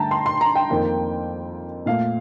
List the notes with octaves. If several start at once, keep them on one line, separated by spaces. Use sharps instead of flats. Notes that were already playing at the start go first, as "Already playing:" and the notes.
Already playing: G2 D3 A3 G5 A5 A#5
C6
C6
A#5
G5
F2 D#3 A#3
A#2 A3 F5